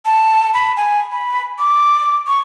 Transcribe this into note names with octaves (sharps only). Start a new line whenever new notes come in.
A5
B5
G#5
B5
D6
C#6